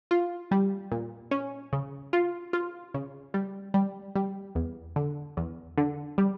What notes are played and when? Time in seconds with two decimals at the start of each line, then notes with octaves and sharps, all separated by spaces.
0.11 F4
0.51 G3
0.91 A#2
1.31 C#4
1.73 C#3
2.13 F4
2.53 F4
2.94 C#3
3.34 G3
3.74 G3
4.16 G3
4.55 E2
4.96 D3
5.37 E2
5.78 D3
6.18 G3